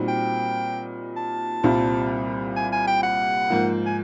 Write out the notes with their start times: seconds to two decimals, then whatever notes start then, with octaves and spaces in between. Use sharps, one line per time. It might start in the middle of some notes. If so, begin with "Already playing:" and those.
Already playing: A#2 G3 C4 D#4 F#4
0.08 G5
1.17 A5
1.63 C2 A#2 G3 C4 F4
2.56 G#5
2.73 G#5
2.88 G5
3.03 F#5
3.50 G#2 F3 A#3
3.86 G#5